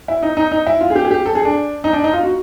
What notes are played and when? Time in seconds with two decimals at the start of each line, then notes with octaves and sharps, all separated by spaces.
0.08 E4
0.23 D#4
0.37 D#4
0.52 D#4
0.66 E4
0.81 F4
0.90 G#4
0.96 G4
1.05 G#4
1.11 G4
1.26 A4
1.35 G#4
1.45 D4
1.84 D#4
1.93 D4
2.04 D#4
2.13 F4
2.23 F#4